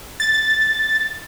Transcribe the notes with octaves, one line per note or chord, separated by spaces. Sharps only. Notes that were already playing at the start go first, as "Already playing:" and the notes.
A6